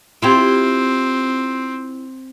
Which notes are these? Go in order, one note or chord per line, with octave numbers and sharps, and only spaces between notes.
C4 E4 F4 G4